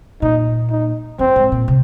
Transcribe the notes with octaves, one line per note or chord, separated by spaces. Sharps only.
A#2 D#4
D#4
F2 C4
G#2
A#2
C3